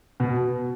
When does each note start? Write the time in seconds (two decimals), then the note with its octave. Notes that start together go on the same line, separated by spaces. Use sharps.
0.20 B2